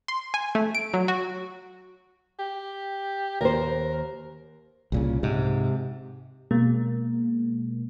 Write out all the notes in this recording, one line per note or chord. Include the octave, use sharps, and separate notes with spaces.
C6
G#5
A3
D7
F#3
F#4
G4
D#2 A#4 C5
C2 A#2 C#3
G#2 C3
B2 G#3 A#3